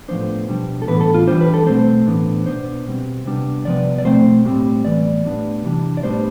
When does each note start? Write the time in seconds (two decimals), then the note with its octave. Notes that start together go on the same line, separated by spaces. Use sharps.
0.08 A2 F3 B3 D4 C5
0.48 B2 G3 D4
0.82 A4
0.88 A2 E3 B3 D4 B4
1.01 A4
1.14 F4
1.27 E3 G3 D4 C5
1.41 B4
1.54 A4
1.67 B2 A3 C4 C5
2.06 A2 E3 B3 D4
2.46 B2 B3 D4 C5
2.86 B2 G3 C4
3.26 C3 G3 B3 D4
3.65 C3 F3 B3 D5
3.98 D5
4.05 B2 A3 C4 C5
4.45 A2 G3 C4
4.85 A2 E3 B3 D5
5.25 A2 G3 B3 D4
5.64 C3 E3 G3 D4
5.97 D5
6.03 A2 G3 B3 D4 C5